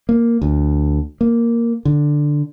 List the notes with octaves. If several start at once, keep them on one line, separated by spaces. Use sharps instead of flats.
A#3
D2
A#3
D3